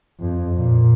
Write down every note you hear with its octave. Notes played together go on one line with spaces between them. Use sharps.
F2
A#2